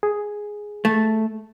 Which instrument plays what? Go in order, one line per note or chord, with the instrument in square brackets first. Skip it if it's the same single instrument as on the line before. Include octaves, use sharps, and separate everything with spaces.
[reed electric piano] G#4
[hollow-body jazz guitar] A3